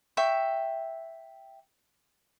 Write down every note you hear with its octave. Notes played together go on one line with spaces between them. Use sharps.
E5 G5 C#6